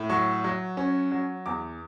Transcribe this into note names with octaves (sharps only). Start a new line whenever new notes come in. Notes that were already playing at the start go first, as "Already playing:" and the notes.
Already playing: A2
F#3 C#6
F#3
C#4
F#3
E2 D6